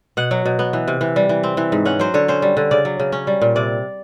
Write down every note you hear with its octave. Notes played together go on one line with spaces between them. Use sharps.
B2 F#5
F#3
B2
B3
E3
C3
E3
G3
E3
C4
E3
G#2
C#4 F#5
F#3 C5
D3 C#5
C#4 C5
G3
D3
C#3 D5
F#3
C#3
C#4
G3
A#2
C3 D5